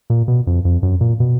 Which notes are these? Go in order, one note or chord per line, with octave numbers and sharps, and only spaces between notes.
A#2
B2
F2
F2
F#2
A#2
B2